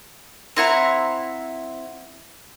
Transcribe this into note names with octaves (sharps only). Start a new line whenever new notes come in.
C4 E4 F#5 A#5